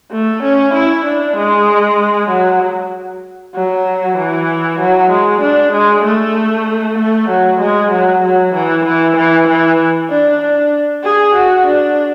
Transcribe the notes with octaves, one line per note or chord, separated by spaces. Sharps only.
A3
C#4
E4
D4
G#3
F#3
F#3
E3
F#3
G#3
D4
G#3
A3
A3
F#3
G#3
F#3
F#3
E3
E3
E3
E3
D4
D4
G#4
F#4
D4